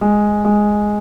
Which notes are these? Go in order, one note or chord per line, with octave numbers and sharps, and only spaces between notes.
G#3
G#3